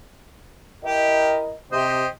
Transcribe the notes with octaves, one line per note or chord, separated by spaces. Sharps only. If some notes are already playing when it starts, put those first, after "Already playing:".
E4 G4 A#4 D#5
C3 G4 C5 D#5